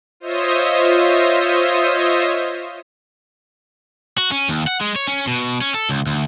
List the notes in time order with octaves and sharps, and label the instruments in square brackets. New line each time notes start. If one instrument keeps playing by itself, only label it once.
[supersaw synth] F4 C5 C#5 D#5 E5 D#6
[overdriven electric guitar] F#4
C#4
D#2
F#5
G#3
C#5
C#4
B2
C#4
A4
C#2
D2